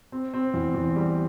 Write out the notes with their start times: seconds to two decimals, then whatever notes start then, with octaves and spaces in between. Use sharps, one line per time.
0.12 C4
0.34 C4
0.54 E2
0.74 E2
0.96 G3